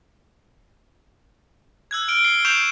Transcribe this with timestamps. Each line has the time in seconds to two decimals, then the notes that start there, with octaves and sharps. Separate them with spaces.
1.91 E6 F#6 G#6
2.08 F6 D7 G7
2.24 C7 G7
2.45 C#6 G6 C7 D7 E7 F7